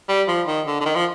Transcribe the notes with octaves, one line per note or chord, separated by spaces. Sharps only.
G3
F3
D#3
D3
D3
D#3
F3